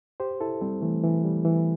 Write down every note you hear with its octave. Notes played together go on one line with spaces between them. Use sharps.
G4 C5
E4 A4
G3 C4
E3 A3
E3
G3
E3